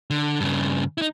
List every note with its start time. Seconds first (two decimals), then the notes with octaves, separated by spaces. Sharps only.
0.10 D3
0.40 G2 C#3
0.98 D#4 E4